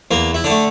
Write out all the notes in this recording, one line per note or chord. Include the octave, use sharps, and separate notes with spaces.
E2 A#3 A#4
E4
D3 D4
A3